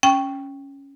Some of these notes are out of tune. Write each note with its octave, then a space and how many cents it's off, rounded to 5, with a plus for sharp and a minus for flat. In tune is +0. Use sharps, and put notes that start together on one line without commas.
C#4 +0 G5 +0